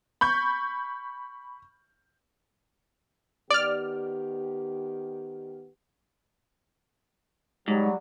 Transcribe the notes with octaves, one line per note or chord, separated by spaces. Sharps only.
B5 C#6 G6
D#3 B3 G4 D5 F6
G#2 F#3 G3